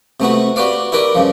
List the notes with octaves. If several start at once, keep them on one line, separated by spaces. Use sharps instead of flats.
C3 A3 B3 F#4
F#4 G4 B4 D5 F5
E4 G4 A#4 B4 D5
G2 C#3 F3